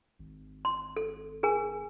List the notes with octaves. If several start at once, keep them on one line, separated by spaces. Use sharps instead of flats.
G#1
C6
A4
G#4 A#4 G#5